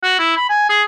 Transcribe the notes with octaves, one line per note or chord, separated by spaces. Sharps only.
F#4
E4
B5
G#5
G#4